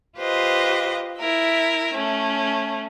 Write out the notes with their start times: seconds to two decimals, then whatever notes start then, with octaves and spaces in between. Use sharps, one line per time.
0.17 F4 G4 B4 C5 D#5
1.20 E4 A#4 E5
1.93 A3 C#4